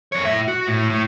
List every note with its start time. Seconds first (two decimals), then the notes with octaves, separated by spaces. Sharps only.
0.12 F2 C#5
0.25 A2 E5
0.48 F#4
0.67 A2
0.90 A2